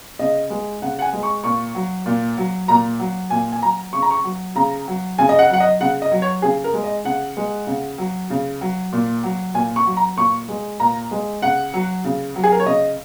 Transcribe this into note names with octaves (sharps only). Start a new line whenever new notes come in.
C#3 D#5
G#3
C#3 F#5
F#5
G#5
G#3
C#6
A#2 C#6
F#3
A#2
F#3
A#2 A#5
F#3
A#2 G#5
G#5
F#3 A#5
C#3 C#6
A#5
C#6
F#3
C#3 A#5
F#3
C#3 G#5
D#5
F#5
F#3 F#5
D#5
C#3 F#5
D#5
F#3
C#5
C#3 G#4
A#4
G#3
D#5
C#3 F#5
G#3
C#3
F#3
C#3
F#3
A#2
F#3
A#2 G#5
C#6
F#3
A#5
A#2 C#6
G#3
A#2 A#5
G#3
C#3 F#5
F#3
C#3
F#3
G#4
A#4
C#5
C#3 D#5